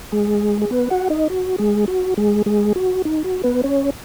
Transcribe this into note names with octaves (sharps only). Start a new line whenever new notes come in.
G#3 G#4
G#4
B3 B4
F#4 F#5
D#4 D#5
F#4
G#3 G#4
F#4
G#3 G#4
G#3 G#4
F#4
D#4
F#4
B3 B4
C#4 C#5